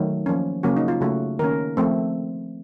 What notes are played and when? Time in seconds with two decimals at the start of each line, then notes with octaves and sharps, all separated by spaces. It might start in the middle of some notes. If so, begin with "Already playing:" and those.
Already playing: D#3 F#3 A3
0.26 F3 A#3 C#4
0.63 C#3 F#3 A#3 C#4 F#4
0.77 D#4
0.88 F4
1.01 C#3 A3 C#4 F#4
1.39 D#3 A#3 C#4 A#4
1.77 F3 A3 C4